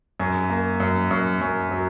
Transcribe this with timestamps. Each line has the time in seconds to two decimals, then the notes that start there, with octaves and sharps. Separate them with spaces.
0.20 F#2
0.50 A#3
0.80 F#2
1.11 F#2
1.41 F#2
1.71 F#3